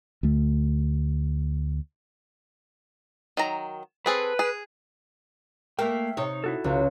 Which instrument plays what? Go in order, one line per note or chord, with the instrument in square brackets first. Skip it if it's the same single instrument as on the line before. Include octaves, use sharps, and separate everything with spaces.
[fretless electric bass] D2 A3
[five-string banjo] D#3 F#3 A#5
[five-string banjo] C4 G#4 A4 [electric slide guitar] B4
[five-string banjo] G#4
[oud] A3 A#3 [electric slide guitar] E5 G5
[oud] C3 D#4 C#5
[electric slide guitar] E4 F#4 A4
[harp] C#2 [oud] F#3